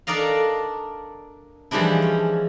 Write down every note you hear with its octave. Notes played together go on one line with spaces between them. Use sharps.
D4 A4 A#4 D5 D#5 F5
E3 F3 G3 G#3 D4 E4
C#4